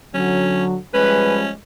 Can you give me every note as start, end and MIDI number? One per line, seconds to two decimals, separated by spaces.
0.14 0.76 50
0.14 0.76 54
0.14 0.64 61
0.94 1.53 53
0.94 1.53 55
0.94 1.53 56
0.94 1.50 61
0.94 1.37 71